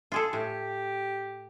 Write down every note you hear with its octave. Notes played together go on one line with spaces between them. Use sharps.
F4 G#4 A4
A2 G4